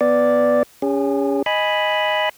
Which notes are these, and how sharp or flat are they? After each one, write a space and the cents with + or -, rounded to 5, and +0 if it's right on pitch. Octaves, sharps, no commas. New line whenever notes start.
B3 +0 D5 +0
C#4 +20 G#4 -40
D#5 +0 G#5 +0 B5 +0